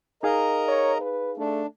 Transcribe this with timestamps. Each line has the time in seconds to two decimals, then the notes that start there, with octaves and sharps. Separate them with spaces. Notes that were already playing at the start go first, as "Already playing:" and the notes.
0.23 D#4 G#4 A#4 D#5 F5 A#5
0.68 C#5
1.01 B4
1.37 A3 D4